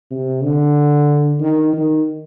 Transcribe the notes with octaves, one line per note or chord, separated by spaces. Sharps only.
C3
D3
D#3
D#3